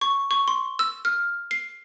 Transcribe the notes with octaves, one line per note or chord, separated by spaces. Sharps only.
C#6
C#6
C6
E6
F6
C7